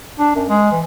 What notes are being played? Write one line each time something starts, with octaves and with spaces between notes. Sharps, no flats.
D4
F#2
G#3
E3